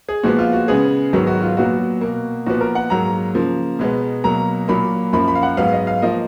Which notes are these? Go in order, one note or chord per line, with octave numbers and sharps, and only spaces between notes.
G#4
A#2 F3 G#3 B3 F#4
F4
F#4
C#3 G#3 B3 G#4
G#2 D#3 F#3 B3 F#4
F#4
F4
A#2 F#3 B3 F#4
B2 A#3
A#2 F3 B3 F#4
A#4
F#5
G#2 F#3 A#3 A#5
C#3 F3 A#3
B2 G#3 B3
B2 F#3 A#3 A#5
A#2 F#3 A#3 B5
F#2 F3 A#3 B5
B5
F5
F#5
G#2 F#3 B3 F5
D#5
F5
F3 A#3 D#5